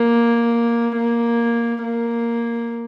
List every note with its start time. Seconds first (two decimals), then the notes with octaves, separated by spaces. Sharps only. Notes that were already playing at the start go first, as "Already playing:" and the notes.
Already playing: A#3
0.97 A#3
1.82 A#3